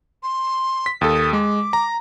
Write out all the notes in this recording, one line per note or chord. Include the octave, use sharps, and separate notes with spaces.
C6
B6
D#2 A4 D#6
G#3 D6
A#5